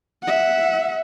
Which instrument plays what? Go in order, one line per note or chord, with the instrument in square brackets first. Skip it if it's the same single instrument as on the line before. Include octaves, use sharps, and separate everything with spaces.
[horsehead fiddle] E5 F#5